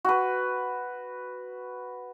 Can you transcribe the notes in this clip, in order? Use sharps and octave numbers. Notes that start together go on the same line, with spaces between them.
F#4 B4